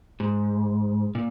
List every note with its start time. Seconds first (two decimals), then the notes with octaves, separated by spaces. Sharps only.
0.20 G#2
1.15 A#2